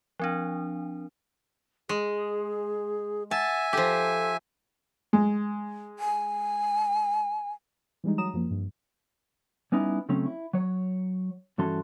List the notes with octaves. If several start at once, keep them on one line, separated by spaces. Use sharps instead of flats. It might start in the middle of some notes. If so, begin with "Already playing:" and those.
F3 C4 D4
G#3 G#4
E5 F#5 G#5 A5
F3 G4 A4
G#3
G#5
E3 G3 G#3 D#4
F#3 A#5 D#6 E7
F#2 F3 A#3
G2
G3 B3 C#4 D#4 E4
C#3 F#3 A3 C4 C#4
E4
F#3 C#5
G2 E3 C#4 F#4 A4 C6